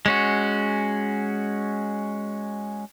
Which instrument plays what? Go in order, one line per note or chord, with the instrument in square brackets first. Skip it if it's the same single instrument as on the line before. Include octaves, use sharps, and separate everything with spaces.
[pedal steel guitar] G#3 C#4 F#4